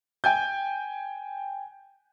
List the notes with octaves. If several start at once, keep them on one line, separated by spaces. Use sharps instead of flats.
G5 G#5 G6